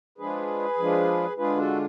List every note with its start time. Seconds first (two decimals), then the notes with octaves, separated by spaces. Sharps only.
0.18 F3 G#3 D4 F4 G#4 B4
0.78 F3 G#3 D4 F4
1.37 D3 G#3 D4 F4 G#4 B4
1.57 F#4 A4